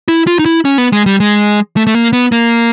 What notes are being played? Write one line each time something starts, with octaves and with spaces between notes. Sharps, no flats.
E4
F4
D#4
E4
C#4
B3
G#3
G3
G#3
A3
A3
A#3
B3
A#3